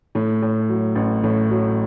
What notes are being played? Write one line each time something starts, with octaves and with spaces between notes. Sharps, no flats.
A2
A2
F#3
A1
A2
F#3